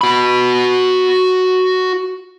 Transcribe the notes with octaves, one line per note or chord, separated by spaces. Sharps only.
F#4 B5